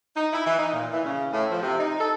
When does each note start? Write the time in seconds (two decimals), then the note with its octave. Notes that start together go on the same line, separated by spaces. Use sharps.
0.17 D#4
0.33 E4
0.46 E3
0.59 D#4
0.73 A#2
0.93 E3
1.06 C#3
1.33 A2
1.51 F3
1.62 C3
1.79 D#4
2.00 A4